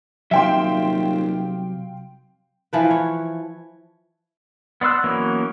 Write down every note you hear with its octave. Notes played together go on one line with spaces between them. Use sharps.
D#1 C3 F#3 E5 F5 G5 C6
E3 F3 B4
C#5
B3 D5 C6 E6 F#6
E3 F#3 A#3 B3 C#4